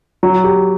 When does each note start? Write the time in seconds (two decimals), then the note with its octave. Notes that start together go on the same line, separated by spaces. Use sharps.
0.23 F#3
0.44 G4